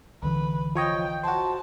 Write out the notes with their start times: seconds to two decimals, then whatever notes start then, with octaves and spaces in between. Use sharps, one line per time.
0.22 C2 D3 E3 B4
0.75 F3 C#5 D#5 G5
1.23 F#4 C5 A5